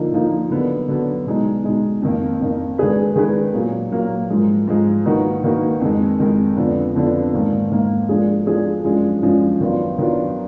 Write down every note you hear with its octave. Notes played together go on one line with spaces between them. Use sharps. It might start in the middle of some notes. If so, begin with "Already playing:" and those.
Already playing: D3 F3 A#3 D#4
D3 F3 A#3 D#4
D3 F#3 B3
D3 F#3 B3
B2 G#3 D#4
B2 G#3 D#4
F2 D#3 A#3
F2 D#3 A#3
D#3 G#3 D4 G#4 B4
D#3 G#3 D4 G#4 B4
A#2 F#3 A#3
A#2 F#3 A#3
G#2 F3 G#3
G#2 F3 G#3
D#3 A#3 D#4 F#4 B4
D#3 A#3 D#4 F#4 B4
F2 D#3 G#3
F2 D#3 G#3
F2 D3 F3 B3 D4
F2 D3 F3 B3 D4
G#2 D#3 A#3
G#2 D#3 A#3
F3 G#3 D4 G#4
F3 G#3 D4 G#4
F#2 F3 G#3 D4
F#2 F3 G#3 D4
D#3 F#3 B3 D4 F4
D#3 F#3 B3 D4 F4